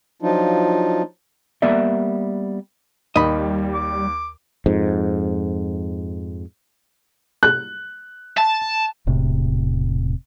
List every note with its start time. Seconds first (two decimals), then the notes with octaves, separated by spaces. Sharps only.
0.22 F3 F#3 D4 D#4 F4
1.62 G3 A#3 B3 A#4 D5 E5
3.16 D#2 G3 D#5 B5
3.75 D6
4.66 F2 G#2
7.43 F#6
8.38 A5
9.07 E1 A2 C3